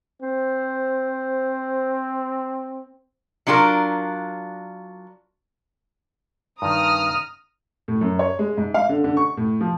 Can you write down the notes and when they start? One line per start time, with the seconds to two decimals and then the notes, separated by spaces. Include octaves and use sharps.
0.22 C4 C5
3.47 F#3 D4 F4 G#4 A#4
6.62 G2 D#3 A#5 D#6 F6
7.88 A2
8.01 F#2
8.19 C#5
8.39 G#3
8.57 G#2
8.74 F5
8.89 D3
9.04 D3
9.17 C#6
9.37 A2
9.61 F3